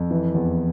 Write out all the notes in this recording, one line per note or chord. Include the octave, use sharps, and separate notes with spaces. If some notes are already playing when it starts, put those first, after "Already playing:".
Already playing: F2
E3
E2